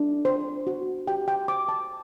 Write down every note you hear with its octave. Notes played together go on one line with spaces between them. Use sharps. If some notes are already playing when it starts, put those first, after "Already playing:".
Already playing: D4
C5
F#4
G4 G5
G5
C5 D6
A5